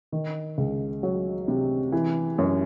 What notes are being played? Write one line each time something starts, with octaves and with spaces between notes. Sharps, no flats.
D#3
C#2
F#3
C3
E3
F#2